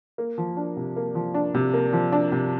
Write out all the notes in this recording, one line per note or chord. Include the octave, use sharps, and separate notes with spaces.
A#3
F3
D4
C3
A#3
F3
D4
C3
A#3
F3
D4
C3